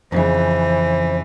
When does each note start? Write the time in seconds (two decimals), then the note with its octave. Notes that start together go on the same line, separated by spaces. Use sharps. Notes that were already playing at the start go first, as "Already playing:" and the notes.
0.12 F2 C#3 E3 C5